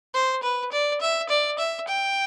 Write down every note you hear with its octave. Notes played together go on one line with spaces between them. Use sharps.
C5
B4
D5
E5
D5
E5
G5